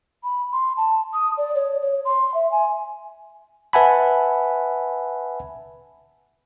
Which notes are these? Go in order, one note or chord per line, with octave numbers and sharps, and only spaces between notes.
B5
C6
A5
D#6
D5
C#5
C#5
C6
E5
G#5
B4 E5 F#5 G#5 A5 B5